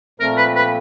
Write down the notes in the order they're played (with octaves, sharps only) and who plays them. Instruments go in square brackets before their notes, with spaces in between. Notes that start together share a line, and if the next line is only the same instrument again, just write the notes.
[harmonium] A#2 F3 A3 C4 [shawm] A#4
[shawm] B4
B4